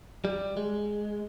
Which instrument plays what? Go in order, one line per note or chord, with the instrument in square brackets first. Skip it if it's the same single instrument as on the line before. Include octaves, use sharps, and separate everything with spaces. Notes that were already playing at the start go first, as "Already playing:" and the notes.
[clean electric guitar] G3
G#3